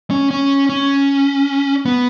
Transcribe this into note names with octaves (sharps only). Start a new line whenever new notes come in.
C#4
C#4
C#4
B3